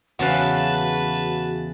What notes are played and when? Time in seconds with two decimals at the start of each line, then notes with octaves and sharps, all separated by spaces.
0.19 E2 C#3 F#4 B4 F5 F#5 A5 F#6